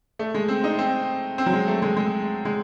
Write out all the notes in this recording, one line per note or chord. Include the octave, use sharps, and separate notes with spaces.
A3
G#3
C4
D#4
C4
C4
F#3
G#3
A3
G#3
G#3
G#3